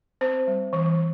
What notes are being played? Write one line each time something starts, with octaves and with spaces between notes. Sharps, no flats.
C4 C5
G3
E3